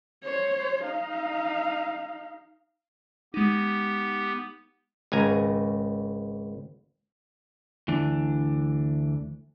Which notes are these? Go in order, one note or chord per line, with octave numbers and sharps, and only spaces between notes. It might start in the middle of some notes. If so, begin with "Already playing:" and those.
C5 C#5
D#4 F5
G#3 B3 D#4 G4
G#1 C#2 G#5 A#5
D2 E3 D4